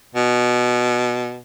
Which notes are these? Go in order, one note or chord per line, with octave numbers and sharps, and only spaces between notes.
B2